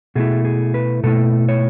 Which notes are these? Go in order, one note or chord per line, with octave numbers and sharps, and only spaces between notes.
B2 A3 E4 G#4
G#4
B4
B2 A3 E4 A4
C#5